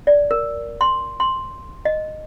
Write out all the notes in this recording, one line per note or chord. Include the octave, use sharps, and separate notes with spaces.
D5
A#4
C6
C6
D#5